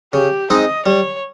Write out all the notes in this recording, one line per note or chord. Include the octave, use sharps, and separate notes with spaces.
C#3 G4
G#3 C4 D#4 D#5
G3 C#5